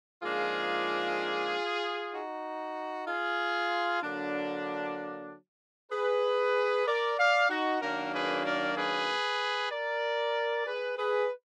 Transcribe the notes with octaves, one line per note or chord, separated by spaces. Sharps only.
G#2 F3 A#3 D4 F4 G#4
D#4 F#4
F4 G#4
D3 F#3 A#3 D4
G#4 B4
A#4 D5
D5 F5
D#4 F#4
F#2 D#3 F#3 A#3 D4 F#4 A#4
G#4 B4
A#4 D5
G#4 B4
A#4 D5
G#4 B4
G#4 B4